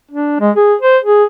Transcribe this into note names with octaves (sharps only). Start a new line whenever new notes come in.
D4
G#3
G#4
C5
G#4